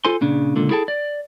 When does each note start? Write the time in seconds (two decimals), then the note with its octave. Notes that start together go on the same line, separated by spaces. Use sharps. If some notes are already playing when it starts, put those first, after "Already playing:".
0.05 F4 A4 C5 G#5 C6
0.21 A#2 C#3 D4
0.56 C#2 A#2 D3
0.71 E4 G#4 A4 G5 A5
0.88 D5